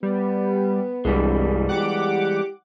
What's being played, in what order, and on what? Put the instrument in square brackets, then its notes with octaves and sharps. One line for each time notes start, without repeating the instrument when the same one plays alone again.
[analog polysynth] G3 [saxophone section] B3
[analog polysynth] C2 G2 [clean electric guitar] E3 G3 G#3
[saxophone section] G4 [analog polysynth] F#5 D6